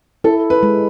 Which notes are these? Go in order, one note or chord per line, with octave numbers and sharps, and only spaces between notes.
E4 A4
B4
G#3